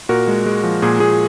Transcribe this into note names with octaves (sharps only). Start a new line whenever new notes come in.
A#2 F#4 A#4
G#3
G#3
F3
A#2 G#4
A#2 G#4